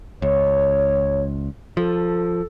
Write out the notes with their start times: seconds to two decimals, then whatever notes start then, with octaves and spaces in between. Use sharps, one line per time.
0.22 C#2 C#5
1.77 F3 A4